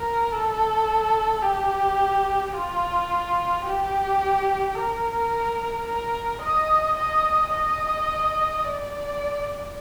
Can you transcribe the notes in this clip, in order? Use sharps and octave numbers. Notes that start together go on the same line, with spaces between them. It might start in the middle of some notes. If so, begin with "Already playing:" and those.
Already playing: A#4
A4
G4
F4
G4
A#4
A#4
D#5
D#5
D#5
D5